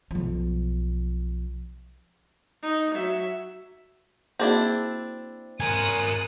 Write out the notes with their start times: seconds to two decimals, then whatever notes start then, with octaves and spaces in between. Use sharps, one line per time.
0.11 B1 F3
2.63 D#4
2.95 F#3 E5
4.39 A#3 C4 D4 E4 F#4 G#4
5.60 A#4 G#5 D#6 F#6